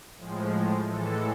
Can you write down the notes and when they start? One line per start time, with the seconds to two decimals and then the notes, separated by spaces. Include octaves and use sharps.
0.18 A2 F3 G#3
0.86 A2 E3 G#3 A4